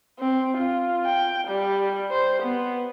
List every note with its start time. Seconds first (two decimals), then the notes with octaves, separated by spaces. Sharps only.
0.20 C4
0.58 F4
1.06 G5
1.48 G3
2.11 C5
2.43 B3